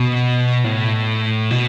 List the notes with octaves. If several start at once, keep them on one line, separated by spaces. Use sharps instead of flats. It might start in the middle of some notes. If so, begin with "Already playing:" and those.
Already playing: B2
A2
B2